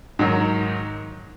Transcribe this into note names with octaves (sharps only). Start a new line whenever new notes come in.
G#2 D#3 F#3